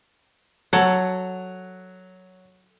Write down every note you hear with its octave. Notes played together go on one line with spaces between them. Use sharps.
F#3 A4 C#5 F#5